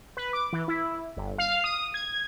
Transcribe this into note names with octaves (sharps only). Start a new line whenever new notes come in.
B4
D6
E3
E4
G1
F5
D#6
G#6